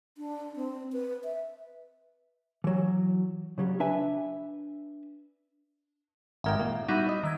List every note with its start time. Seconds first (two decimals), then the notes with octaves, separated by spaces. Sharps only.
0.18 D4
0.56 C4
0.93 B4
1.24 E5
2.64 E3 F#3
3.58 C#3 F#3 G3
3.80 D4 B4 E5 G#5
6.44 G#1 G#3 A#4 E5 G5
6.60 A#2 A#3
6.88 G3 B3 D#4 E4 F#4
7.09 D#5
7.23 D#3 E6 G#6